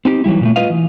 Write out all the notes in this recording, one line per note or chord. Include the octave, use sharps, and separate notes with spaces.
C4 D#4 G4
E3 F#3 G3 E4
A#2 E3 A3
F4 B4 D#5 F5
E3